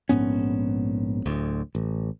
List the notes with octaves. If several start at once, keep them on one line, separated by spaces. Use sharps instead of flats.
A#1 G#2 B3 C#4
D1 D2
A1